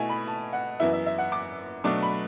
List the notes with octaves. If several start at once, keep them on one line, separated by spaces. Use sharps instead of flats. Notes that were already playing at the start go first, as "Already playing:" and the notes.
Already playing: B2 A3 E4 G#5
B5
A5
F#5
F#2 E3 B3 E4 E5
E5
E5
F#5
D6
B2 F#3 A3 D4 D6
B5